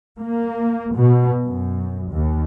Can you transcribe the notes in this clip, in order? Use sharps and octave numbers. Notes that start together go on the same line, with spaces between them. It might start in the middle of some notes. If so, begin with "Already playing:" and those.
A#3
B2
F#2
D#2